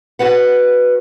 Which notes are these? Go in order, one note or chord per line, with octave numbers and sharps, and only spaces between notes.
F#4 G#4 B4 F#5